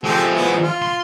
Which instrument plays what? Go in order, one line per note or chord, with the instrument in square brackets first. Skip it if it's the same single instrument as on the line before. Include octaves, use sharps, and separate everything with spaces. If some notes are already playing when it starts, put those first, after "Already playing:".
[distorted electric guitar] F3 G#3 [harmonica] C4 G4 A4
[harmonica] B3 E4
F4
[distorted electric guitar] C6